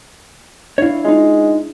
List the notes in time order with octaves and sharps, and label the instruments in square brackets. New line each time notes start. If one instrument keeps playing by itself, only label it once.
[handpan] D4 E4 [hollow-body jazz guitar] C#5 F5
[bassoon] G#3 [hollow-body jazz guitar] D#4 F4